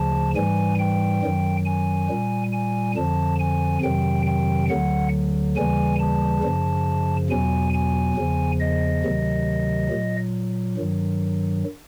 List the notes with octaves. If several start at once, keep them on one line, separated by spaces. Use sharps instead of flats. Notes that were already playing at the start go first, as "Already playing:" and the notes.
Already playing: D2 C#3 F3 A5
G#2 E3 G3 G#5
G5
F#2 D#3 F#3
G#5
A#2 G3
G#5
F2 D3 F3 A5
G#5
F2 C3 D#3 F#3 G5
G5
D2 D3 F#3 F#5
D#2 C#3 E3 G3 G#5
A5
F#2 C#3 F3
E2 B2 F#3 G#5
G#5
E2 C#3 F3
D#5
D2 C3 D#3 F#3
A#2 F#3
G2 D#3 F#3